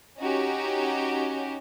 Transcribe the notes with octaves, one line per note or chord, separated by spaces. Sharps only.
C#4 D#4 F#4 G4